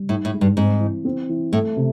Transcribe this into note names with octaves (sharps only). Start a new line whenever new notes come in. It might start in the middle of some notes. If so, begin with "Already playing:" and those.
Already playing: G3
A2 D#4
A2
G#3
G2
G#2 C4
E3
C4
E3
A2 A3
C3